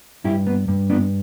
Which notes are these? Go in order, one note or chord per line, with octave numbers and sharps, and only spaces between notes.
G2 E4 G4
B3
G2
B3 D4